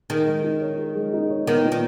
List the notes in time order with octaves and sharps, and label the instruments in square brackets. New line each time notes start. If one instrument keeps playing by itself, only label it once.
[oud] D#3 [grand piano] G#4
[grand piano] G#3
D#4
C#5
G#4
G#3
D#4
C#5
[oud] D#3 [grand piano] B3
[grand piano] A#2
[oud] D#3